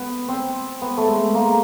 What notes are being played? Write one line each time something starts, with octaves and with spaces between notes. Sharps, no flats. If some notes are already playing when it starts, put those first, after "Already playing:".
Already playing: B3
C4
B3
A3
G#3
A#3